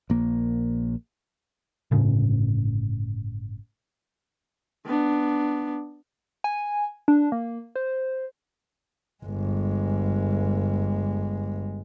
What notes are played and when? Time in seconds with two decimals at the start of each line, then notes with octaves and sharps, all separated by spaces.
0.10 A#1 A#3
1.91 G1 A2 C#3
4.86 B3 D4
6.44 G#5
7.08 D4
7.32 A#3
7.76 C5
9.24 G1 G#3